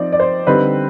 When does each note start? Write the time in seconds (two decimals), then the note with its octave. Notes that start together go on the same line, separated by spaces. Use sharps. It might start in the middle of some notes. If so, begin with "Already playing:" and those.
Already playing: F3 C4 D#4 D5
0.13 D5
0.20 C5
0.47 D3 G3 C4 D#4 B4